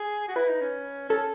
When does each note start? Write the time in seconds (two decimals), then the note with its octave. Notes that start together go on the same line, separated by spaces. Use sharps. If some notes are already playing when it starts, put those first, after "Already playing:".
Already playing: G#4
0.28 F#4
0.36 E4 B4
0.49 D#4
0.61 C#4
1.09 C#4 A4